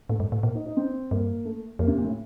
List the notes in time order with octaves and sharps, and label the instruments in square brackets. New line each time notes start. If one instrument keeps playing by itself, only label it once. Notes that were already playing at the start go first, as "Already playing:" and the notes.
[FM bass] A2 [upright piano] A3
[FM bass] G2
A2
[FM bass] A#2 [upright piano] A#3
[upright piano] D#4
D#4
C4
[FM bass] G2 [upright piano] A#3
[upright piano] A3
[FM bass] F2 [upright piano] A#3
[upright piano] C3
A#2
A2